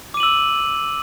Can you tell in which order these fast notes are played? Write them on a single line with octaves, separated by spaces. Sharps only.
D6 D#7 F#7 E6